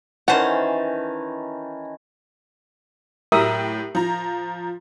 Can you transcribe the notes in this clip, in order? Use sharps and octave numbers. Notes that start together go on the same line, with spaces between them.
D#3 E3 C#4 C5 F#5 A5
A2 F#3 G4 A#4 E5 D#6
F3 A#5